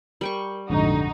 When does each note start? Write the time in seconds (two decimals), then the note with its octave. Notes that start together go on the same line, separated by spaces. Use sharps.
0.21 G3 A#4 G5 C#6
0.70 A#1 F2 G#2 D3 D#4 F#4